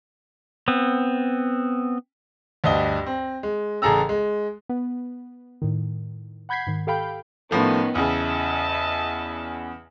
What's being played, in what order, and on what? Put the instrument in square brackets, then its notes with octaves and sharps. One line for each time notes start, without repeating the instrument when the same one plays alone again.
[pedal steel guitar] B3 C4
[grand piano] D2 G2 D#5 G7
C4
G#3
A1 C#3 G#4 A4 A#5 E6
G#3
[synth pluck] B3
A2 D#3
F#5 B5 G6 G#6 B6 C7
G#2 D#3
G4 A4 F5 G5 B5 G6
[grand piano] A2 F3 A3 [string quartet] D#3 B3 C#4
[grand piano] E2 C#3 [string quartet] D#5 E5 A5